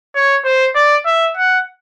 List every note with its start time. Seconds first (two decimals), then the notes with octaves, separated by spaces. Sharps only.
0.15 C#5
0.45 C5
0.75 D5
1.06 E5
1.37 F#5